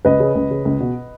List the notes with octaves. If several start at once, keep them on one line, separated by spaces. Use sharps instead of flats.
C#2 B4 D#5
C#3
C#2
C#3
C#2
B2